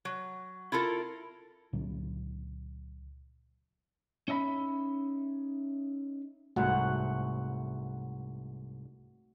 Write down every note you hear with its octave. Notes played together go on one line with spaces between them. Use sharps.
F#3
E4 F4 A4 A#4
C#2 A#2 D3 F#3
C#4 D#4 E5 A#5 B5
C2 G#2 A3 F#4 F#5